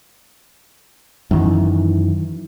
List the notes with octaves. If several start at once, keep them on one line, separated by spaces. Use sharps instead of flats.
F#2 D#3 E3